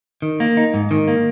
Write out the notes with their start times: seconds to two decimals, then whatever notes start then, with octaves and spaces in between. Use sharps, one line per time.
0.22 D#3
0.40 A#3
0.57 D#4
0.74 G#2
0.91 D#3
1.08 A#3